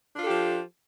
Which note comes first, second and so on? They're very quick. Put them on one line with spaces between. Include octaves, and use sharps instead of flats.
D4 F4 A4 G4 F3